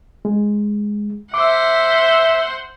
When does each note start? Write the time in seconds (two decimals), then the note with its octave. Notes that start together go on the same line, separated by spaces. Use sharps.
0.25 G#3
1.34 C5 E5 F#5 D6